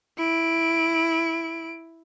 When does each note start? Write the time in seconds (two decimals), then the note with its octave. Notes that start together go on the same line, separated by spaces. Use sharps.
0.18 E4 D7